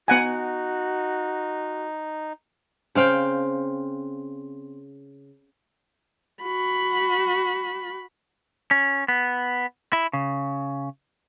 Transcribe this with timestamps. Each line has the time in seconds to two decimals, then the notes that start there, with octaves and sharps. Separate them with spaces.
0.08 B3 D#4 F#4 F#5 G#5
2.95 C#3 C4 F5 G5
6.44 F#4 B5
8.71 C#4
9.08 B3
9.93 E4
10.13 C#3